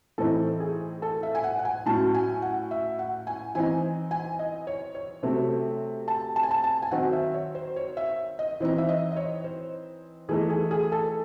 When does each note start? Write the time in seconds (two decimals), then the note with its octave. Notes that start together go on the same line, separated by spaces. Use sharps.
0.18 A2 E3 C4 D#4 A4
0.60 G#4
1.02 A4
1.23 E5
1.35 G#5
1.44 F#5
1.59 F#5
1.65 G#5
1.86 A2 F#3 C#4 A5
2.14 G#5
2.42 F#5
2.71 E5
2.99 F#5
3.27 G#5
3.55 E3 C4 D#4 G#5
4.11 G#5
4.39 D#5
4.67 C#5
4.95 C#5
5.23 C3 F#3 A3 C4
6.08 A5
6.36 A5
6.43 G#5
6.51 A5
6.64 A5
6.82 G#5
6.91 D#3 F#3 C4 D#4 F#5
7.13 E5
7.34 C#5
7.55 C5
7.76 C#5
7.97 E5
8.39 D#5
8.60 E3 C4 D#4
8.78 E5
8.89 D#5
9.12 D#5
9.16 C#5
9.44 C5
10.29 E3 A3 D#4 G#4
10.50 G#4
10.71 G#4
10.92 A4